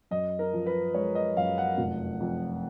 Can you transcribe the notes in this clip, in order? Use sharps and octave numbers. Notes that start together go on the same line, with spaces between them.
F#2 D#5
A#4
F3
B4
G#3 C#5
D#5
F#2 F5
F#5
F1
F2